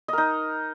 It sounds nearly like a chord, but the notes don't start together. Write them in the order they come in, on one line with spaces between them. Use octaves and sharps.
D#5 A#4 D#4